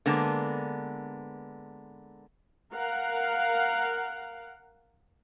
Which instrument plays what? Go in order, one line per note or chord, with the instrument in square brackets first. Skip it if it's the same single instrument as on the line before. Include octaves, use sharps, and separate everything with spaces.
[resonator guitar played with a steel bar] D3 G#3 A#3 B3 A5
[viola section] A#4 F5 F#5